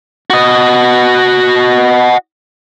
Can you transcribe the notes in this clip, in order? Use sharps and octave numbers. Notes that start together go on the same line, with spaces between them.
F#4 D#5